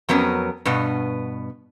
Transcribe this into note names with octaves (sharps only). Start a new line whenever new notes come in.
F2 F#3 B3 C#4 A#4
G2 B2 B3